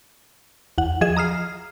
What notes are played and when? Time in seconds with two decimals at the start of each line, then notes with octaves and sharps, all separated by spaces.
0.78 E2 F#5
1.01 F3 G#4 D#5 G#6 E7
1.17 A#5 D#6 F6 C7